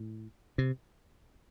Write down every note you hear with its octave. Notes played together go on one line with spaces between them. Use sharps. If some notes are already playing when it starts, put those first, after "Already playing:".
Already playing: A2
C3